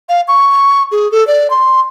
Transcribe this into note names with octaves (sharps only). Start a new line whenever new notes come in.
F5
C#6
G#4
A4
D5
C6